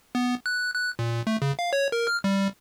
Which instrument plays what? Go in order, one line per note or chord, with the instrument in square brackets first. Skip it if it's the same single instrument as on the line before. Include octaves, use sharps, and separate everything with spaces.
[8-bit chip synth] B3
F#6
F#6
A#2
A3
C#3
F5
C#5
A#4
F6
G3